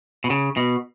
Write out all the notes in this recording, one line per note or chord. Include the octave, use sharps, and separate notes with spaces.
B2
C#3
B2